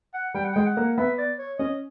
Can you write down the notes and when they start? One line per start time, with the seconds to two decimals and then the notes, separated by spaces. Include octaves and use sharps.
0.14 F#5
0.34 G3 G5
0.44 F#5
0.53 G#3 G5
0.66 F#5
0.77 A#3
0.97 B3 E5
1.18 D5
1.39 C#5
1.59 C#4 D#5